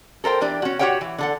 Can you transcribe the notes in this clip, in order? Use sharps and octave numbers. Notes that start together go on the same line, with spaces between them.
A4 A#4 C5 G5
E3 D4 G4
C#4 F#4
F#4 G4 A#4 C#5 F#5 G5
E3
D3 A4 F#5